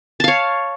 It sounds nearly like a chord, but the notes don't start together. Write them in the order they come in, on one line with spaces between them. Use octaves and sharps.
A5 F5 C#5